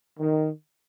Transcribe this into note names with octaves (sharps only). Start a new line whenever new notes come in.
D#3